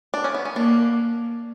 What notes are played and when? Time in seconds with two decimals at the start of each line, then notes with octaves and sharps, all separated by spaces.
0.14 D4
0.24 C#4
0.35 B3
0.45 C#4
0.56 A#3 D4